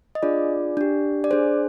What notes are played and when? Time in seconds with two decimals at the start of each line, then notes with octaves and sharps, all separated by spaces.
0.15 D#5
0.23 D4 F4 G#4 D5
0.77 D4 G4
1.24 D5
1.31 D4 G#4 C5